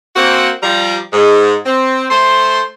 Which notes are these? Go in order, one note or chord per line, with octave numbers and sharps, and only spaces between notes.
A#3 C4 F#4
F3 G3 A#5
G#2
C4
A3 C5 C6